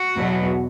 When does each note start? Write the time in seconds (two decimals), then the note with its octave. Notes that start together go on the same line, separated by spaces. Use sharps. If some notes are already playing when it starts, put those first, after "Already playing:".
Already playing: F#4
0.17 E2 B2 F#3 B3